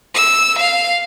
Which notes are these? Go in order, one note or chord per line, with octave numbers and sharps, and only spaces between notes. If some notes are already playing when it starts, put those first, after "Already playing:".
E6
F5